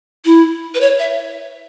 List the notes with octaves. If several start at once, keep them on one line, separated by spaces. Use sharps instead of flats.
E4
B4
C#5
E5